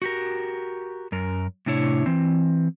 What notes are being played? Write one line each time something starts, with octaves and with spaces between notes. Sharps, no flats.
F#4 G4 A#4
F#2 A#4
A2 C3 D4 E4 C#5
E3 C4